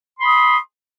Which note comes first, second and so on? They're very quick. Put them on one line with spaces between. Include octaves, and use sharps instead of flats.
C6 B5 D#6